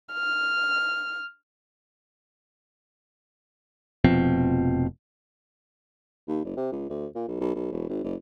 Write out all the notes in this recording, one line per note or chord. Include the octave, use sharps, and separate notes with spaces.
F6
F1 B2 F3 C4
D#2
F#1
C3
C#2
D2
A#2
B1
B1
B1
E1
G#1
F#1